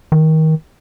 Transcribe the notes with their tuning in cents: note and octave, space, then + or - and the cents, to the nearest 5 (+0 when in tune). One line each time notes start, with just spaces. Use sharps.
D#3 +25